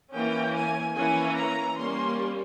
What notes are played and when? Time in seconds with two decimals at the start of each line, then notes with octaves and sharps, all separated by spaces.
0.14 E3 A#3 C#4 G5
0.55 G#5
0.96 E3 A#3 C#4 G#5
1.37 A#5
1.78 G3 A#3 C#4 C6